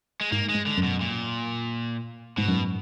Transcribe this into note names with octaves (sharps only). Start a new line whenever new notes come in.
G#3
G#2 A#3
G#3
G#2
D3
F#2
B2
A#2
G#2 B2
F#2